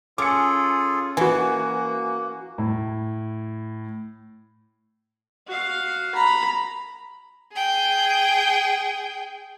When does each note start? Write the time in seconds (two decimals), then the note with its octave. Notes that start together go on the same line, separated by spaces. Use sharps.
0.18 C#4 F4 G#4 A4 D6 C#7
1.17 E3 A#3 F#4 G#5
2.58 A2
5.47 F#4 F5
6.15 A#5 B5
7.52 G#4 G5